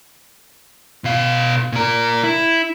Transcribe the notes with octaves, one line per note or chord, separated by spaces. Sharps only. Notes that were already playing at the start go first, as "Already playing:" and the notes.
B2 F5
A#2 A#4
E4